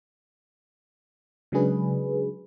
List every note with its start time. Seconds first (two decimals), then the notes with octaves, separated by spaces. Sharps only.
1.52 C#3 F#3 G#3 D4 G#4 B4